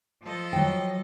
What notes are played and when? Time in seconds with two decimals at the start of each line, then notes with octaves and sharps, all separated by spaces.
0.22 F3 A4 D#5
0.53 F#3 G5